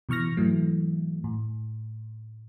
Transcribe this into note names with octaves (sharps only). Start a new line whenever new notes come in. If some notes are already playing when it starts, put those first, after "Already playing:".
B2 E3 C#6 F6 A#6
G#2 E3 F#3 A3
A2